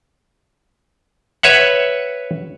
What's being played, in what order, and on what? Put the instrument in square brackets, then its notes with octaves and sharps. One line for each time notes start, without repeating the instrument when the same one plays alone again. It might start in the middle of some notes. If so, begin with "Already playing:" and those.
[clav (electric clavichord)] B4 C#5 E5 F#5